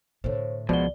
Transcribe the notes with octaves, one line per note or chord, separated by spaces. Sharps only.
A2 D3 C5 C#5
C#2 B2 F3 G#3 F#4 D5 G7